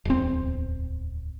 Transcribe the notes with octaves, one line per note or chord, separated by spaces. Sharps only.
D1 E2 C4